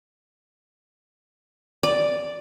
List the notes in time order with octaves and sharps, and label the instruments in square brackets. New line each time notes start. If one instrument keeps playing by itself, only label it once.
[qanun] D5